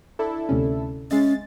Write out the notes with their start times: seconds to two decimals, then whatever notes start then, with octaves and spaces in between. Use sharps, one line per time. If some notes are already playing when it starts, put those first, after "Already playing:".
0.19 D4 E4 A4
0.49 D2 C3 C#4
1.11 G#3 C#4 D#5 E5 A6 C7